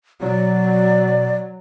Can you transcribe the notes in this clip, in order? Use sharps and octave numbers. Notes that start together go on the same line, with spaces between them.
B2 F#3 D5